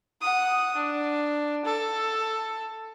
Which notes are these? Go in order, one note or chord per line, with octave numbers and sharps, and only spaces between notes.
F#5 D#6
D4
A4